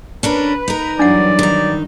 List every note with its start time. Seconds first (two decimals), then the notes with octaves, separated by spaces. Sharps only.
0.23 C#4 D4 A#4 B4
0.68 D#4 A#4
0.99 G2 E3 F#3 D4 D5 F#5
1.39 D#3 D#4